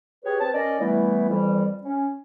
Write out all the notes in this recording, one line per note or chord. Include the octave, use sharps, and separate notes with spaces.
G4 G#4 B4 C#5
C4 B4 A5
C#4 A#4 D5 D#5
E3 G3 A3 B3 E4
F2 E3 G3
C#4